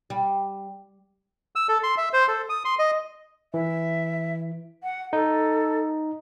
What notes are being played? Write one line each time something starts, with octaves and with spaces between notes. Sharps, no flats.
G3
E6
A4
C6
E5
C5
A4
D#6
C6
D#5
E3 E5
F#5
D#4 A4